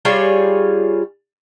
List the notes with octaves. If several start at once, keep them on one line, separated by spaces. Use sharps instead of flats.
G3 F4 G#4 C#5